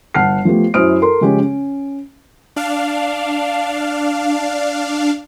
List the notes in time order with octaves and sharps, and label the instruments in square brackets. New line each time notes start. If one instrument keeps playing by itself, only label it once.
[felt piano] G1 F#5 A5 F6 C7
F3 A3 B3 G4
F#2 E4 C5 D#6 F6 D7
A4 A#4 C6
C#3 F3 G#3 C#4 G4
C#4
[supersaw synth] D4 F5